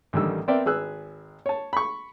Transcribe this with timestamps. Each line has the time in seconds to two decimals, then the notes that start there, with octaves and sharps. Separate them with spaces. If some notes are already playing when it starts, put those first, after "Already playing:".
0.13 A1 D3 D#3 G3 E6
0.48 B3 C4 A#4 D5 E5 G5
0.66 G#1 G#4 B4 E6 F#6
1.46 C#5 A5
1.73 B5 C#6